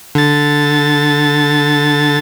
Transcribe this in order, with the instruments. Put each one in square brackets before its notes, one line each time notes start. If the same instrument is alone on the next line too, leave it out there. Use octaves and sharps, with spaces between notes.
[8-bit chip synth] D3 A6